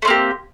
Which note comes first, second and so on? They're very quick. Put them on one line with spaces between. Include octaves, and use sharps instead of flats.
A3 C4 A#3 G4